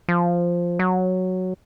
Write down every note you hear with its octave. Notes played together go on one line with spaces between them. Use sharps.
F3
F#3